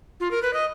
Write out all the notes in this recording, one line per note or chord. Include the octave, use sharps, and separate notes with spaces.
F4
A#4
B4
D#5